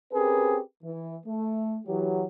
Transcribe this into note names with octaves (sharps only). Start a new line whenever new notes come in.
C4 C#4 G4 G#4 A#4 B4
E3
A3
E3 F#3 G4